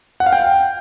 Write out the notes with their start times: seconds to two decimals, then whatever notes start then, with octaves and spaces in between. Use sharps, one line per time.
0.20 F#5
0.26 F5
0.33 G5